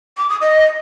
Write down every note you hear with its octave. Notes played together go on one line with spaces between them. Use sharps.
D6
D#6
D#5